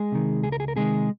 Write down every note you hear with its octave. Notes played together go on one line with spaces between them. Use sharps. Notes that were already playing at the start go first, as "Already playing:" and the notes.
Already playing: G#3 G#4
C3 D#3
C#2 G#4
A#4
G#4
A#4
C3 D#3 G#3 G#4